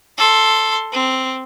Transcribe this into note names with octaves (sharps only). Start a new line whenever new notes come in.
A4 C6
C4